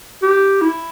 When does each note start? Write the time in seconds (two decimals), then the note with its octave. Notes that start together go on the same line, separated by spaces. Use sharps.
0.22 G4
0.61 E4